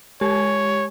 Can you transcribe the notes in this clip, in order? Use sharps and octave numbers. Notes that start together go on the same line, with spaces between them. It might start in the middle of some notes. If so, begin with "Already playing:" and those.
G#3 G4 C#5 G#5